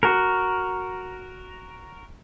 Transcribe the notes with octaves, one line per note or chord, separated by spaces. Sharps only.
F#4 A#4